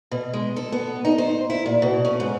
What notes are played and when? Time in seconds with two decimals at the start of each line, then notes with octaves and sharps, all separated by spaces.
0.11 B2
0.33 G#3
0.56 A4
0.72 B3
1.05 D#4
1.18 C5
1.50 E4
1.66 A#2
1.82 B2
2.05 C#4
2.20 G#2